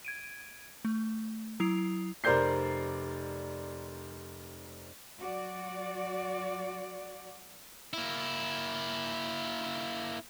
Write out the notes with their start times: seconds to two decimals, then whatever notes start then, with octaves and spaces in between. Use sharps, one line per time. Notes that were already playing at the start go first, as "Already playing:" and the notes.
0.05 G#6 D7 D#7
0.85 A3
1.60 F#3 E4 D#6 C7 F7
2.24 F1 A#4 C5 D5 G6 C7
5.16 F#3 F#4 D5
7.93 A#3 E4